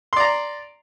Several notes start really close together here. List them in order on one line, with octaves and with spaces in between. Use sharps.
C6 D5 A#5